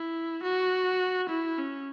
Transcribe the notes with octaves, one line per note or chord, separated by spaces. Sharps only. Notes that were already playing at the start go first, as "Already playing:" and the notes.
Already playing: E4
F#4
E4
C#4